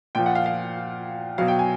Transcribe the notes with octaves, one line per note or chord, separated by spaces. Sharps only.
A#2 F3 G5
F#5
F5
F5
B2 F#3 F5
G5
G#5